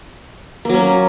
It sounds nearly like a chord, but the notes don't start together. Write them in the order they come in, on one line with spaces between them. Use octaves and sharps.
A#3 F#3 C#4